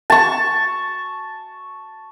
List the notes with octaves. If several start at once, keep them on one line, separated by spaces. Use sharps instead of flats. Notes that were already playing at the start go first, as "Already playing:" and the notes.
A5 C#6